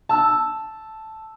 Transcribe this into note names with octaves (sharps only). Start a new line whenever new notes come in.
A5 E6